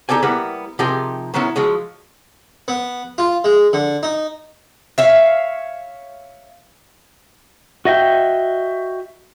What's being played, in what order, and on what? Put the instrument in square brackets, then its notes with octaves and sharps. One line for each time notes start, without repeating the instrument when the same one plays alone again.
[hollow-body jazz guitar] D#4 G4 A4 D5 G#5
G3 A#3 B3 E4 B4
C3 F3 D#4 G4 G#4 A#4
A#2 F#3 B3 C#4 E4
F3 F#3 G#3
[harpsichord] B3
F4
G#3
D3
D#4
[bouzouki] C#5 E5 F5
[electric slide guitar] F#4 D#5 E5 G5